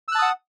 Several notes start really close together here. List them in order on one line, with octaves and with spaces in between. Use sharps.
E6 F#6 A5 D#6 F#5